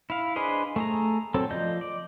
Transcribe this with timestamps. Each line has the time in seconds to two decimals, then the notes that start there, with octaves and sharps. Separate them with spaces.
0.10 E4 F5
0.36 D4 G#4 B4 C5 D#5
0.76 A3 G#4 A#5
1.34 F#3 C4 A4
1.50 F3 D5 D#5 G6
1.81 D5